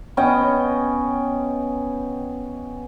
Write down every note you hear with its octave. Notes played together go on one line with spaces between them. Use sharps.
B3 C#4 D#5 G5